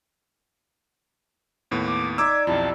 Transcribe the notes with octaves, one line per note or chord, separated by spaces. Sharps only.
D#2 A2 B3
D6
D#4 D5 E5 D6 E6 G#6
B1 F2 E4 G4 A5